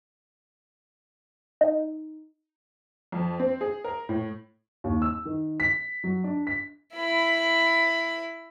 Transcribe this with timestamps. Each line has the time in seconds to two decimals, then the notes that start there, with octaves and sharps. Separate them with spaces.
1.61 D#4
3.12 F2
3.39 C4
3.61 G#4
3.84 A#4
4.09 A2
4.84 D#2
5.02 E6
5.25 D#3
5.60 B6
6.04 F#3
6.24 D4
6.47 B6
6.96 E4 B5